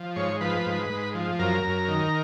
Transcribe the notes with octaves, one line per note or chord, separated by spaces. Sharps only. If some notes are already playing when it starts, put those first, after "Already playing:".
Already playing: F3
G#2 C#5
F3 B4
G#2
G#2
F3
F#2 A#4
F#2
D#3